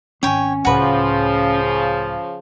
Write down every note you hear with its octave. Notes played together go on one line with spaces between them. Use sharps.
G#1 C#4 C#5 G5 G#5
C#2 A2 C#3 F3 F#4 B4